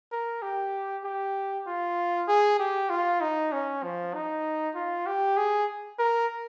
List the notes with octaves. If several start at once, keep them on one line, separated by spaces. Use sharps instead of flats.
A#4
G4
G4
F4
G#4
G4
F4
D#4
C#4
F3
D#4
F4
G4
G#4
A#4